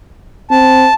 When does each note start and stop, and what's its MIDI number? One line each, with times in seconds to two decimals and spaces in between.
0.51 0.87 60
0.51 0.94 81